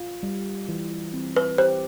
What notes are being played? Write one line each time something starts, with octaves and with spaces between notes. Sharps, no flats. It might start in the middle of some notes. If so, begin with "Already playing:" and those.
Already playing: F4
G3
E3
C4
B4
G4 C5